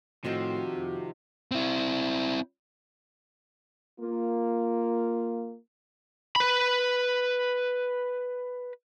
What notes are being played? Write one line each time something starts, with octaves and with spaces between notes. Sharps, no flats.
A2 C3 D#3 F3 F#4
F2
C4 E4
A#3 F4
B4 B5